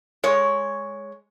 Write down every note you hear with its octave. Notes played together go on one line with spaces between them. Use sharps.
G#3 C#5